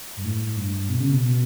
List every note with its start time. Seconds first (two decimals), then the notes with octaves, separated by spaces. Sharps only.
0.17 G2
0.24 A2
0.56 G2
0.89 B2
1.00 C#3
1.11 B2
1.22 B2